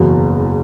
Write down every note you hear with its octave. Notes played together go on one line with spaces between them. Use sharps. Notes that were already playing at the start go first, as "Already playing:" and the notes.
Already playing: F#1 E2 B2